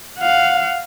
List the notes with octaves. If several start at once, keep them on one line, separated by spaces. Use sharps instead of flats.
F5 F#5